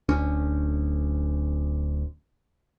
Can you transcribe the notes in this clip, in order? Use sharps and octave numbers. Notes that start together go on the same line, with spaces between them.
D1 D2 C#4